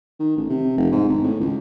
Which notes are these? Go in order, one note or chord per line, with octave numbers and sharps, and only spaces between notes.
D#3
A1
C3
F1
G#2
G#1
A2
C#2